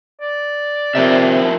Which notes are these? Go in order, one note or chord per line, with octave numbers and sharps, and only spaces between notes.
D5
C3 F3 A#3 E5